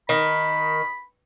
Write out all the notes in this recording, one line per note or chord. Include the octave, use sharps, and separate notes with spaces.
D#3 B5